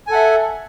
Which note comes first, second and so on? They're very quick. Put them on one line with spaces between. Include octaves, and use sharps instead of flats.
G#5 A4 F#5 E5